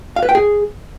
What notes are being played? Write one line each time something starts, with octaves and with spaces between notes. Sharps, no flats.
F5
B4
G5
G#4